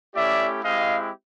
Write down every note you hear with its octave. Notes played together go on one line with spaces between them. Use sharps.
A3 C#4 E4 G4 D5 E5
G#3 C4 E4 G4 D#5 F5